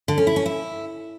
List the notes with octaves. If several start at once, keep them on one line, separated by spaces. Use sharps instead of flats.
D3
C#4
E4
C#4
E4